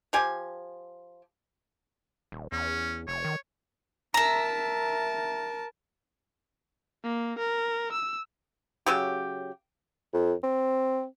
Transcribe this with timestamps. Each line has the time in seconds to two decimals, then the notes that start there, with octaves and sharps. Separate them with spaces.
0.13 F3 G4 G#5
2.32 D#1
2.52 E2 C#4
3.08 F1 C#5
3.25 D#3
4.14 A#4 E5 A5 A#5
7.04 A#3
7.39 A#4
7.92 E6
8.86 C#3 F#3 G4
10.14 F2
10.43 C4